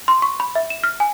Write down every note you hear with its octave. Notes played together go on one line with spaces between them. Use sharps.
C6
C#6
B5
E5
E7
F6
G#5